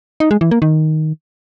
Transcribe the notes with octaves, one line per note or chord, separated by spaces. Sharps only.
D#4
G#3
E3
A#3
D#3